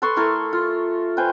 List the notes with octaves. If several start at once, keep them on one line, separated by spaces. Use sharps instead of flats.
A4 B4 C6 C#6
A3 E4 A4 A#4
F4
B4 C5 G5 G#5